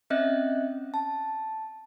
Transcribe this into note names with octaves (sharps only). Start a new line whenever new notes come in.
C4 C#4 D#5 E5 F#6
A5